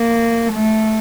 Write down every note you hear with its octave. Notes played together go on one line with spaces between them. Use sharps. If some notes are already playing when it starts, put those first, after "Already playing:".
Already playing: A#3
A3